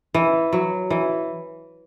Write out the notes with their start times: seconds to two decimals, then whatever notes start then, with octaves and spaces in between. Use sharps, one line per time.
0.14 E3
0.53 F#3
0.90 E3